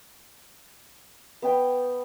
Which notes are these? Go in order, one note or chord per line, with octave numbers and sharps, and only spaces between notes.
B3 G5